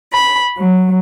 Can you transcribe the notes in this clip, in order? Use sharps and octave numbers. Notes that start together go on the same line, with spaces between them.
B5
F#3